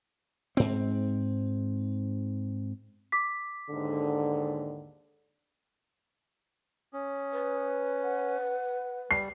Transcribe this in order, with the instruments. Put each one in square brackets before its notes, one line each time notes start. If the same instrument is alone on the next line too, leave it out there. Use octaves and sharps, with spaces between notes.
[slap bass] G#2 C4
[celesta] D6 B6
[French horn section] D#2 G#2 D3
[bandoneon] C#4 [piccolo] D#6
[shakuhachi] B4
[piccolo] F#5
[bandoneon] G3 [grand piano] C7